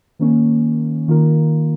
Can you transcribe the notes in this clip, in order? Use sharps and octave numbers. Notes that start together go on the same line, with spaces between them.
D#3 A#3 C#4
D#3 A#3 F4 A#4